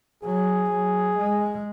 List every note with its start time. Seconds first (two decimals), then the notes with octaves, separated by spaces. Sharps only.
0.23 F#3 G#4
0.71 F#3
1.17 G#3